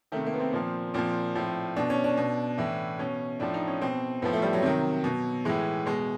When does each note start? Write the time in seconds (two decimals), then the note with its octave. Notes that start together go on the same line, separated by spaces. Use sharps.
0.12 C3 D#3 A3
0.26 A#3
0.34 B3
0.40 C4
0.53 A#2 F3
0.94 A#2 F3 C4
1.35 A2 F3
1.76 B2 D4
1.90 C#4
2.04 D4
2.17 B2
2.58 A2 E3
2.99 B2 C#4
3.40 A2 F3 D4
3.54 D#4
3.67 C#4
3.81 B2 C4
4.22 A2 F3 B3
4.33 A3
4.42 G3
4.53 F#3
4.63 C3 D#3
5.04 B2
5.45 A2 E3 G#3
5.86 B2 G#3